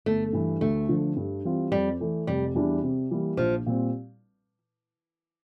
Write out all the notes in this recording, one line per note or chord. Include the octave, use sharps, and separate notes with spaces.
G1 A3
G2 E3 G3
D2 A3
D3 F3
G2
E3 G3 C4 F4
F2 G3
E3 A3
F1 G3
E2 E3 G3 D4
C3
E3 G3 A#3
A#1 F3
A#2 G3 C4